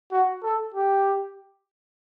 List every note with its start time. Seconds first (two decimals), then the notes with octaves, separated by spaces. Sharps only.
0.12 F#4
0.43 A4
0.74 G4